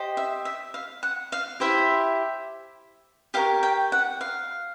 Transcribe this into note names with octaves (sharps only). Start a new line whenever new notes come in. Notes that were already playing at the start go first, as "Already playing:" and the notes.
Already playing: G4 C5 D#5
E5
E5
F5
F#5
F5
E4 G4 C5 E5
G4 A#4 C#5 F5
G5
F#5
F5